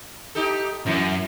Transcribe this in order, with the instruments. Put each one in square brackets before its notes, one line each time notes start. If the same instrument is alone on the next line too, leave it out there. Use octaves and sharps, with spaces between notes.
[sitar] D#4 G4 A4
[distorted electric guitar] F#2 [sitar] E3